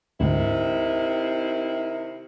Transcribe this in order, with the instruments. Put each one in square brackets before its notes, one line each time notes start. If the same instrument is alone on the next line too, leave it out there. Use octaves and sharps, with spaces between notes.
[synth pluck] D2 G#2 [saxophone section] C3 D#3 E4